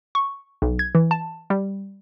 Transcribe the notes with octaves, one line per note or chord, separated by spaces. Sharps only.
C#6
B1
G#6
E3
A5
G3